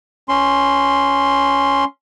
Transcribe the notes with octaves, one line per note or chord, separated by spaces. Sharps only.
C#4 C6